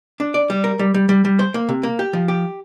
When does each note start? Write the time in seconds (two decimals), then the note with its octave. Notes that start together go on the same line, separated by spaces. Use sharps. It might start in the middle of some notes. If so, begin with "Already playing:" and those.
0.20 D4
0.34 D5
0.50 G3
0.64 A#4
0.79 G3
0.94 G3
1.09 G3
1.25 G3
1.39 C5
1.54 A#3
1.69 C3
1.83 A#3
1.99 G4
2.13 F3
2.28 G4